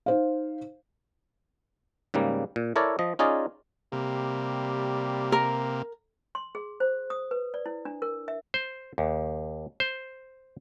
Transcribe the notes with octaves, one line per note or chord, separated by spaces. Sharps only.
D#4 C5 F5
G#2 C#3 G3 A#3
A#2
E4 A4 A#4 C#5 D5
F3 D#5
C#4 D#4 F4 G#4 D5 D#5
C3 G3 A#3
A#4
C6
G#4
C5
D#6
B4
D5
E4
D4
A#4
E5
C5
D#2
C5